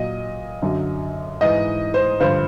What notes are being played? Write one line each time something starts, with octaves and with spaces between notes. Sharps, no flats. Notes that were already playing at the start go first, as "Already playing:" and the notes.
Already playing: A#2 F#3 D#5
F#2 D3 F#3
G#2 E3 D#5
C5
G2 D3 F3 C5